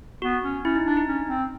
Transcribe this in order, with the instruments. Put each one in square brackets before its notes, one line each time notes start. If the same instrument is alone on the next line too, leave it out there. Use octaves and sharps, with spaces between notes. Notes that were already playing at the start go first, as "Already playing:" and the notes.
[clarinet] B3 [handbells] F#4
[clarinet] C#4
[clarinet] C#4 [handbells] E4
[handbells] D#4
[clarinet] D4
[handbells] D#4
[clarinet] C#4
C4